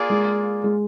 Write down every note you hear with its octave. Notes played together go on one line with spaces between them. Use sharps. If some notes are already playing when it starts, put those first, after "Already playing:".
Already playing: A#3 F4 G#4 D5
G#3
G#3